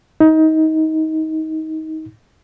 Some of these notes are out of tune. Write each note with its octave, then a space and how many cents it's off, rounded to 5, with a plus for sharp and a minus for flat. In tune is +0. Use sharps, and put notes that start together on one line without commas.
D#4 +25